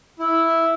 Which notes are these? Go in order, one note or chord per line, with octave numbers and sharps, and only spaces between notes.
E4